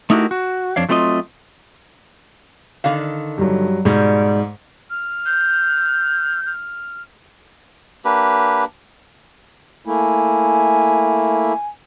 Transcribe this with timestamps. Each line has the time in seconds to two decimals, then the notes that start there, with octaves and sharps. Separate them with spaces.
0.10 A3 D#4 E4 F#4 G4 A#4
0.31 F#4
0.76 F2 D4 C#5 F5
0.89 F#3 A3 C4 F4 D5 D#5
2.84 D3 D#3 F5
3.38 G2 F#3
3.85 G#2 B2 G3
4.90 F6
5.26 G6
6.46 F6
8.05 A#3 D4 G4 B4
9.85 A3 A#3 E4 G#5